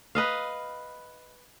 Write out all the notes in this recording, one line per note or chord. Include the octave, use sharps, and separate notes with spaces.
B4 D#5 F5